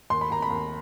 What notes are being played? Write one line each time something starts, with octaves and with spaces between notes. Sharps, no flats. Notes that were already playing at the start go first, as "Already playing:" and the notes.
D#2 C6
B5
D#2 A#5
B5
D#2